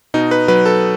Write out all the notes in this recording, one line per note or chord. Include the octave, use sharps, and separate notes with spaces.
B2 D#4
B4
F#3 B4
A4